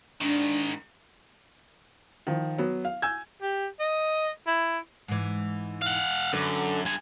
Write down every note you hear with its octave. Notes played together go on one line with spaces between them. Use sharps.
G#2 D#3 D4
D#3 F3
F#3 B3
F5
G#5 E6 G6 G#6
G4
D#5
E4
G#2 E3
F5 F#5
F#2 D3 B4
G2 G#5